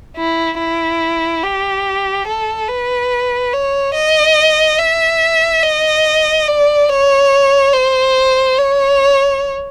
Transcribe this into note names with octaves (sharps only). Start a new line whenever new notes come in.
E4
E4
G4
A4
B4
C#5
D#5
E5
D#5
D5
C#5
C5
C#5